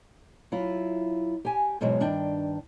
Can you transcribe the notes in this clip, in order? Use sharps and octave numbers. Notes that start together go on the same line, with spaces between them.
F#3 E4 F4
G4 G#5
G#2 B2 E3 F#3 G#3
G2 D#3 D4 G5